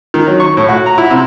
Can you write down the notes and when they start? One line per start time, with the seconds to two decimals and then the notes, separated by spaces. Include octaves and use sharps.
0.14 D#3
0.27 F#3
0.40 C#6
0.57 A2
0.69 F#4
0.86 A#5
0.98 E4
1.11 C3